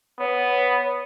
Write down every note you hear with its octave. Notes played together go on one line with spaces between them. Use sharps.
B3 C#5